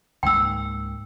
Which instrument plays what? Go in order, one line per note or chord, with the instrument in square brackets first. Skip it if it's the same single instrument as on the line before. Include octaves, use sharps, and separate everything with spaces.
[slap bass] C#2 G#2 A#3 [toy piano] G5 E6